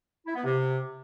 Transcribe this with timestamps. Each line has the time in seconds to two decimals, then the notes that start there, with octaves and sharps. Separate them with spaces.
0.26 E4
0.35 B3
0.44 C3